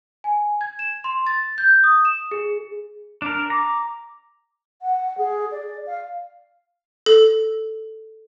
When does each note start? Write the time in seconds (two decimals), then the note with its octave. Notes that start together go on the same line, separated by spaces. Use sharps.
0.24 G#5
0.61 G#6
0.79 E7
1.04 C6
1.27 A6
1.58 G6
1.84 D#6
2.05 E7
2.31 G#4
3.22 D4 A#4
3.50 A#5 D6
4.82 F#5
5.18 G#4
5.52 D5
5.87 F5
7.06 A4